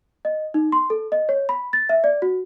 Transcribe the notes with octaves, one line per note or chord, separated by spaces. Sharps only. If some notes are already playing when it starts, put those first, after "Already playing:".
D#5
D#4
C6
A4
D#5
C#5
B5
A6
E5
D5
F#4